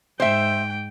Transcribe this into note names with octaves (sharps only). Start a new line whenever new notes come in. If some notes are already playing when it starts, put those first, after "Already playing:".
G#2 C5 E5 G5